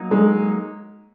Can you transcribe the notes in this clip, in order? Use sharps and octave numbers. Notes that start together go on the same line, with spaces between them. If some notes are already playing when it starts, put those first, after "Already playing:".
Already playing: F#3 A#3 D#4
G#3